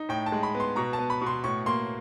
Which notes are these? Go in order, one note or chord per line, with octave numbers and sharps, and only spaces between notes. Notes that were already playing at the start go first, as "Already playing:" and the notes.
Already playing: D#4
A2 G5
A5
G#3
B5
B3
C6
B2 A#5
A5
B3
B5
B2 C6
A2 C#6
A#3 C6